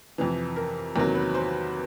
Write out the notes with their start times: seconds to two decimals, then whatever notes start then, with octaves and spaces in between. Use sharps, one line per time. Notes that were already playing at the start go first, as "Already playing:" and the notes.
0.18 F2 C3 E3
0.56 A#4
0.96 E2 C3 D#3 F#3 A#3 A#4
1.15 B4
1.34 C5